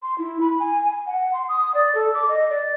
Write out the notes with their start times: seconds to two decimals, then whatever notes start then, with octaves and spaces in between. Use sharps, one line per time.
0.03 C6
0.18 E4
0.41 B5
0.60 G#5
1.07 F#5
1.33 C6
1.49 D#6
1.74 D5
1.95 A4
2.15 D6
2.29 D#5
2.50 D5